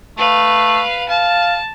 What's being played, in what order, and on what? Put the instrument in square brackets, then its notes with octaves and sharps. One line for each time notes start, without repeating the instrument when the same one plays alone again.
[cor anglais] A3 [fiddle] B4 F5
[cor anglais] F5 [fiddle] A5